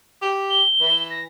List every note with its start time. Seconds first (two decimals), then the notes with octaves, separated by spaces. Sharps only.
0.22 G4
0.50 G7
0.81 E3
1.10 A#6